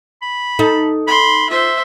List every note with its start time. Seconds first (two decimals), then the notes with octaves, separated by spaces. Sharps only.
0.22 B5
0.59 D#4 A4
1.07 B5 C6
1.50 F4 C5 E5